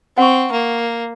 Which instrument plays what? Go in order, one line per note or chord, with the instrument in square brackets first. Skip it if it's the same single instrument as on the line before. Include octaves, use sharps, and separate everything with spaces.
[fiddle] C4 [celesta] F#5 C#6
[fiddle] A#3